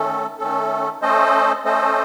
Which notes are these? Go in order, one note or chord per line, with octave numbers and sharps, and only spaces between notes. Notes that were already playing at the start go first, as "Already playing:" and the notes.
Already playing: D#3 A3 C#4 A4
D#3 A3 C#4 A4
A3 C#4 A4 C5 D#5
A3 C#4 A4 C5 D#5